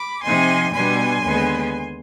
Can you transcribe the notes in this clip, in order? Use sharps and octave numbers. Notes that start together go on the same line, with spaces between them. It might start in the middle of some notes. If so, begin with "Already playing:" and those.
Already playing: B5 D6
C3 F3 C4 D#4 G#5 C6
B2 G3 B3 D4 G#5 C6
D#2 D3 G#3 B3